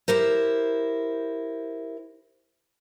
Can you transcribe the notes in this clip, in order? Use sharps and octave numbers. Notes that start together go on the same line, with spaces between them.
E4 G4 A#4 C5